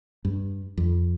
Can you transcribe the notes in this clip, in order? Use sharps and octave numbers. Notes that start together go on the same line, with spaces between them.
G2
F2